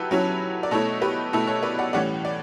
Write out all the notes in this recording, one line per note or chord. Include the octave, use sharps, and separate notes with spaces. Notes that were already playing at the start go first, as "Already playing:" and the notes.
Already playing: F#3 E4 G4 A4 B4
F#3 C#4 E4
D5
B2 A3 E4 A4 C#5
G4 B4
B2 A3 E4 A4
A4 C#5
B4 D5
D5 F#5
A2 E3 G3 C#4 D5 F#5
D5